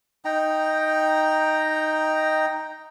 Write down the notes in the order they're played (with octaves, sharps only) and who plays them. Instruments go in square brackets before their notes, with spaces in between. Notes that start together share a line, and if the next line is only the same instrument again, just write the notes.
[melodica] D#4 G5 A#5